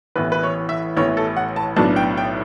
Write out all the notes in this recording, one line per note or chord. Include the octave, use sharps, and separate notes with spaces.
A1 A2 E3 B3 B4
B4
C#5
E5
A1 A2 E3 B3 C#5
A4
F#5
A5
B1 A2 F#3 B3 D4 A5
G5
G5